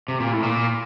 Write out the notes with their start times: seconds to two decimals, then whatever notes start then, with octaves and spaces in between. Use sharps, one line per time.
0.08 C3
0.20 A#2
0.32 A2
0.43 A#2